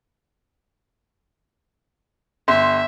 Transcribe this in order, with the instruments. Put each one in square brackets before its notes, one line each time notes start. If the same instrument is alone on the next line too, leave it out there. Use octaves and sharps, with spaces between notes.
[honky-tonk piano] G1 C6 [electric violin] E5